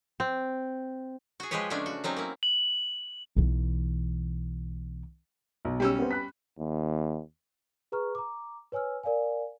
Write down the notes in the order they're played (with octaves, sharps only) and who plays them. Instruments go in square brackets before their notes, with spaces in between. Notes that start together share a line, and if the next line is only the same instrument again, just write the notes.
[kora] C4
[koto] F#4 G#4
F3 G#3 G4 G#4 B4 C#5
C#3 G#3 A3 C#4 D4
F#4
F#3 C4 C#4 D#4
A#3 E4
[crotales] F#7
[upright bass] B1 E3
[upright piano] B1
[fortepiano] G3 C#4 E6
[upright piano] B3 C4
B5 F#6 B6
[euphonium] D#2
[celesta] G#4 B4 A#5 C#6 F6
A#5 D6
B4 C#5 G#5 E6 F6
A#4 D5 F5 G#5